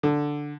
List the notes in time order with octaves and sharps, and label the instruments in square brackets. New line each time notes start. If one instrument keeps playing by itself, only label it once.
[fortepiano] D3